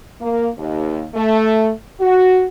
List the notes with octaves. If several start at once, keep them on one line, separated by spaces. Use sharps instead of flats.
A#3
D#2
A3
F#4